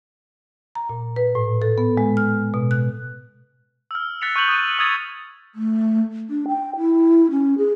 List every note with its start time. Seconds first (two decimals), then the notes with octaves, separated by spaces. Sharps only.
0.75 A#5
0.89 A#2
1.16 B4
1.35 A2
1.62 A4
1.78 B3
1.97 G#3
2.17 F6
2.54 B2
2.71 F#6
3.91 E6 F6
4.21 F#6 A6 B6 C#7 F7
4.36 C#6 F#6 G6 C#7 F7 F#7
4.48 D#6 D#7
4.79 D#6 E6 G#6 A6 F7
5.55 A3
6.30 D4
6.48 G5
6.77 E4
7.31 C#4
7.58 G#4